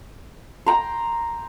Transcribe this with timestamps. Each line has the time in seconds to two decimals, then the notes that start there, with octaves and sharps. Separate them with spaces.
0.66 G5 A#5 C6